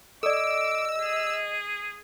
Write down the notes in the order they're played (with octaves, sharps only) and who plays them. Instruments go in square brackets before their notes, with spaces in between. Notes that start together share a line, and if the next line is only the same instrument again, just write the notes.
[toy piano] A4 D5 [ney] D#5 [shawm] D6 [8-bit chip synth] E6
[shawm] G#4